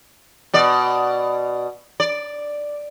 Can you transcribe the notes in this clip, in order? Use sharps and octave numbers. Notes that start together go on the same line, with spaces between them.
B2 D5
D5